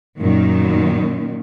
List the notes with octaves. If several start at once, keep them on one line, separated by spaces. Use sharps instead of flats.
F#2 A#2 D#3